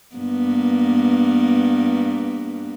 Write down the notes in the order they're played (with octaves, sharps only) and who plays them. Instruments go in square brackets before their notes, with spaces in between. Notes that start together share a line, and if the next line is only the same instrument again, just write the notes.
[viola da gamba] G2 A#3 B3